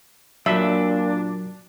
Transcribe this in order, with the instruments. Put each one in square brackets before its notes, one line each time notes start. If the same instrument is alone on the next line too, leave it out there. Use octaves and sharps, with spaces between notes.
[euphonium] A#2 [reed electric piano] F#3 [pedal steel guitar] D4 [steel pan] E5